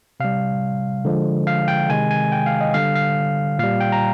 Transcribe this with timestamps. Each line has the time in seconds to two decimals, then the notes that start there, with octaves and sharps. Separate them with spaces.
0.20 C3 G3 F5
1.05 D3 F3 G#3
1.47 F5
1.68 G5
1.89 C3 D#3 G#3 G#5
2.11 G#5
2.32 G5
2.46 F5
2.61 D#5
2.74 D3 G3 F5
2.96 F5
3.59 A#2 G3 F5
3.80 G5
3.92 A#5